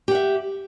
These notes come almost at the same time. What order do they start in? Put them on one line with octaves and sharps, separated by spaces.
G4 F#5 E5